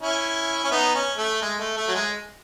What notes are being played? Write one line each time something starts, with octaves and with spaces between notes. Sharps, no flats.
C#4 E4
C#4
B3 D#4
C#4
A3
G#3
A3
A3
F#3
G#3